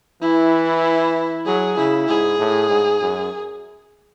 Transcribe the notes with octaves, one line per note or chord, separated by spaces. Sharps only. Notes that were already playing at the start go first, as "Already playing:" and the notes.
E3 E4
F#3 G#4
C#3 E4
G#2 G#4
A2
G#2
F#2